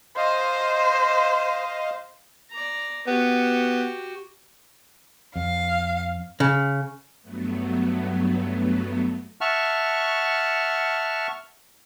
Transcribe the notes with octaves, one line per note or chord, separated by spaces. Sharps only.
C5 D#5 F5
D5 A#5
B3 F#4 G4
F2 F5
C#3
G2 F#3 A3 B3
E5 F#5 A5 C#6 F6